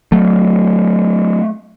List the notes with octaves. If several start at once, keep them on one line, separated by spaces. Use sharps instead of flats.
F#3 A3